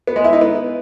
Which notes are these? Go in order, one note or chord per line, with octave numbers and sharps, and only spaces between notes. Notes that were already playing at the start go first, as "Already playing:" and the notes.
B3
G#3
E4
D#4
B3